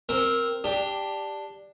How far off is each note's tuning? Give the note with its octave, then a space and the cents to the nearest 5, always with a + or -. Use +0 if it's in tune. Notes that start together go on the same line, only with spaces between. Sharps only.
C4 +0 A#4 +0
D4 +0 G4 +10